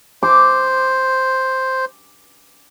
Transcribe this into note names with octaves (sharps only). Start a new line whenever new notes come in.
C5 D6